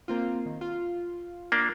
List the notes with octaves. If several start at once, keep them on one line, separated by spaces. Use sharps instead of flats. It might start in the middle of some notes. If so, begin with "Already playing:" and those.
A#3 C4 F4
D#3
F4
A#3 D4